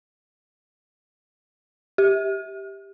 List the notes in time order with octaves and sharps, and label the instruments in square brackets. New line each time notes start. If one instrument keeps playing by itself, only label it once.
[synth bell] G4